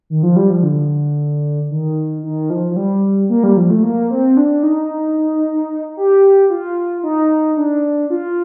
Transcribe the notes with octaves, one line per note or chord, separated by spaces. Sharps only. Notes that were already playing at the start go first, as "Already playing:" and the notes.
D#3
F3
G3
F3
D3
D#3
D#3
F3
F3
G3
A#3
G3
F3
A3
A#3
C4
D4
D#4
G4
F4
D#4
D4
F4